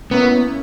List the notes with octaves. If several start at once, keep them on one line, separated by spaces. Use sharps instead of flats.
A#3 B3 C#4 E4